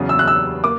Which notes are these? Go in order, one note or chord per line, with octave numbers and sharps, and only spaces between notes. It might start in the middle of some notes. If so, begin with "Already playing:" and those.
Already playing: E2 C#3 F#3 C#4
E6
F#6
E6
A#3 D6